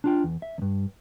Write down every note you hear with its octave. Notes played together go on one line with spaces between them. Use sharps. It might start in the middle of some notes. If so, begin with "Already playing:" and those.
D4 F4 G5
E2
E5
E2 G2